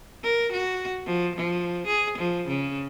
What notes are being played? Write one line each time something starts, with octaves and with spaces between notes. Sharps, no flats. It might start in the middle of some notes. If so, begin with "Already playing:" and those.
A#4
F#4
F3
F3
G#4
F3
C#3